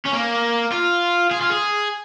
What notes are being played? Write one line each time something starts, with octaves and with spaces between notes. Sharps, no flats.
C#4
A#3
F4
G#4
F4
G#4